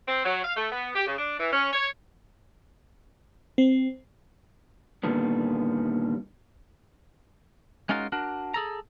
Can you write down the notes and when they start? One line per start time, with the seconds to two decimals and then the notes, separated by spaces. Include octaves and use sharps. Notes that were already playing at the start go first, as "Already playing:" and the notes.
0.08 C4
0.25 F#3
0.44 F5
0.56 A3
0.72 B3
0.95 G4
1.07 C#3
1.19 D4
1.40 E3
1.53 C#4
1.73 C#5
3.58 C4
5.03 A#2 D3 D#3 G3 B3
7.89 G#3 C#4 D#4 F4 F#4 A#4
8.12 D4 F#4 A#4
8.54 G#4 A4 A#5